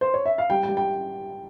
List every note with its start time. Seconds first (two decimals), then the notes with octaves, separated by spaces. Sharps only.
0.01 C5
0.14 C#5
0.26 E5
0.38 F5
0.50 G3 G5
0.63 G5
0.68 G3
0.77 G5